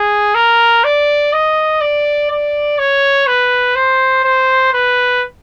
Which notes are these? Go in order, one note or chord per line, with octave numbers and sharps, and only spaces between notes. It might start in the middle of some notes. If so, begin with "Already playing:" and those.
Already playing: G#4
A#4
D5
D#5
D5
D5
C#5
B4
C5
C5
B4